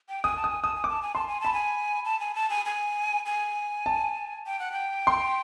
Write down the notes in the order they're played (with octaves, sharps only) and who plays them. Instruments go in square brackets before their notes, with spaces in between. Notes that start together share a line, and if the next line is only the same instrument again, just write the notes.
[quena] G5
[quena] G#5 [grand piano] D#6
[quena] A5
[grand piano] D#6
[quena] G#5
[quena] A5 [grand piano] D#6
[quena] G#5
[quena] A5 [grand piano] D6
[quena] G#5
[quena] A5 [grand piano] C6
[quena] G#5
[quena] A5 [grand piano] B5
[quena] G#5
A5
G#5
A5
G#5
G#5
G#5
[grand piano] A5
[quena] G5
F#5
G5
[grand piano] C6